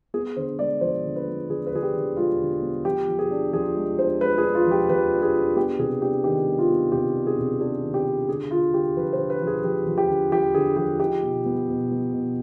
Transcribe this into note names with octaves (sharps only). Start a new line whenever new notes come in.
B3 G#4
D3 C5
G#3 D5
F3 C5
D3
B4
B3
D3 G#4
B4
D3 G#4
G4
D3
G#3 F4
D3
B3
F3 G4
F3
G#4
D4
F3 G#4
G#3
D4 C5
G#3 B4
G#4
D4
F4
F3
G4
F3 B4
D4
G#4
D4
B3 G4
C3 G#4
D4 G4
D#3 G4
B3
F4
B3
C3 G4
D4
G#4
C3
D4 G#4
D#3
G4
D4
D3 G#4
D3 F4
D3 G4
F3 B4
C5
D3
B4
F3
G#4
F3 G4
F3
G4
D3
F3 G4
D3 G#4
F3 G4
D#4 G4
B2
B3
B2
B3
B2